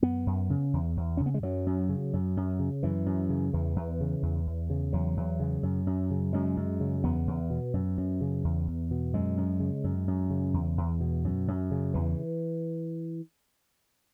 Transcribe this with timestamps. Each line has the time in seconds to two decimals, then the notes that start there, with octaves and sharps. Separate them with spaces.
0.02 F#2 B3
0.26 F#2
0.50 C#3
0.73 E2
0.97 E2
1.17 C#3 C#4
1.26 B3
1.34 G#3
1.43 F#2 F#3
1.67 F#2
1.89 C#3
2.13 F#2
2.37 F#2
2.59 C#3
2.83 F#2 E3
3.06 F#2
3.29 C#3
3.53 E2 E3
3.76 E2
4.00 C#3
4.23 E2
4.47 E2
4.70 C#3
4.93 E2 F#3
5.17 E2
5.40 C#3
5.63 F#2
5.87 F#2
6.11 C#3
6.33 F#2 G#3
6.57 F#2
6.80 C#3
7.04 E2 B3
7.27 E2
7.50 B2
7.74 F#2
7.98 F#2
8.21 C#3
8.44 E2
8.68 E2
8.91 B2
9.14 F#2 G#3
9.37 F#2
9.60 C#3
9.84 F#2
10.08 F#2
10.30 C#3
10.54 E2
10.77 E2
11.00 B2
11.24 F#2
11.48 F#2
11.71 C#3
11.94 E2 E3